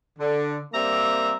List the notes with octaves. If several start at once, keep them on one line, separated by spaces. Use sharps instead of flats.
D3
G3 A#3 C4 E5 A#5